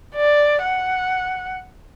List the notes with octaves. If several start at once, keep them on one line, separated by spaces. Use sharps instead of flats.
D5
F#5